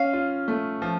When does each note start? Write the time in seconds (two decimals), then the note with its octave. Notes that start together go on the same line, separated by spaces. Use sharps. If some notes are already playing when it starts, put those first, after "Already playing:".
Already playing: C#4 F5
0.13 F4
0.48 A3
0.82 F3